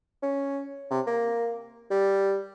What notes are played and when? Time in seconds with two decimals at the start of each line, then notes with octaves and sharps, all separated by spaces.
0.23 C#4
0.91 C3
1.07 A#3
1.91 G3